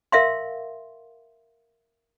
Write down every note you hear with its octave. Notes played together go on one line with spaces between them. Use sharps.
A#4 E5 F5 C6